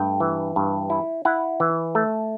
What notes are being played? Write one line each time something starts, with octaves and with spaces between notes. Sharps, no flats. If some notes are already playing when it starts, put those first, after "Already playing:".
Already playing: G2 A3 G5
E3
G2
E4
E4 F#5
E3
A3